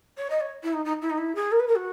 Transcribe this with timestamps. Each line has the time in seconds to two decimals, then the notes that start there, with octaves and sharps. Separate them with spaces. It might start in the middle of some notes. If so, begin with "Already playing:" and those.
0.18 C#5
0.30 D#5
0.40 C#5
0.63 E4
0.73 D#4
0.85 D#4
1.02 E4
1.10 D#4
1.17 E4
1.35 G#4
1.52 A#4
1.59 B4
1.67 A#4
1.76 F#4